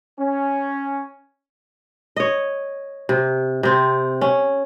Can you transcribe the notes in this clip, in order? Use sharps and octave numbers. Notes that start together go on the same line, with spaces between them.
C#4
C#5 D#5
C3
C3 C4
C#4